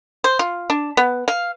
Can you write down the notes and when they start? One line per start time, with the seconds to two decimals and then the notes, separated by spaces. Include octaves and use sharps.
0.24 C5
0.39 F4
0.70 D4
0.97 B3
1.28 F5